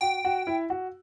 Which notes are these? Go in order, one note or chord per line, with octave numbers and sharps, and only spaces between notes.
F#4 G5
F#4
E4
F#4